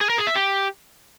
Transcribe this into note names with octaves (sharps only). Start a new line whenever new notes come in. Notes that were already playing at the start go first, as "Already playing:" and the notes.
G#4
A#4
G#4
E5
G4